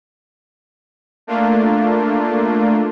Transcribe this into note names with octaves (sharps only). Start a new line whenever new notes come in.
A3 A#3 D4 F4